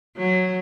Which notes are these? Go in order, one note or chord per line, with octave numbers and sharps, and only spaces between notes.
F#3